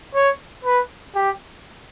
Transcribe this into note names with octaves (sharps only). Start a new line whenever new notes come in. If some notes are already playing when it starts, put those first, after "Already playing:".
C#5
B4
G4